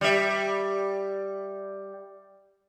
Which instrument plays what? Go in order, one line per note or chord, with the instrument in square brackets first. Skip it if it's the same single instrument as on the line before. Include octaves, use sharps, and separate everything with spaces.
[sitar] G3 E5